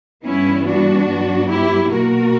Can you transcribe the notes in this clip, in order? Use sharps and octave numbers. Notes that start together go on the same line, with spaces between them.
G2 E3 G3 B3 C#4 E4
D4 F#4
G2 F#3 B3
E4 G4
B2 A#3 F#4 A#4